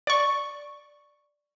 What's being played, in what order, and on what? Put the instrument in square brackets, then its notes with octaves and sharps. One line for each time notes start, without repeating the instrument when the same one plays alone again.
[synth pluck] D5 C#6